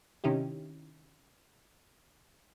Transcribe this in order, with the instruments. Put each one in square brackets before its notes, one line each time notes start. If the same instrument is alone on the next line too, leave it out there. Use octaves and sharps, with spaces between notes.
[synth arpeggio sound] C3 D#3 C#4 D#4 E4 G4